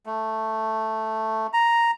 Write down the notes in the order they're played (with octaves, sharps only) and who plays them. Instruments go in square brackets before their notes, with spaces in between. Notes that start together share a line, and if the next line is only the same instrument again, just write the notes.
[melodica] A3
A#5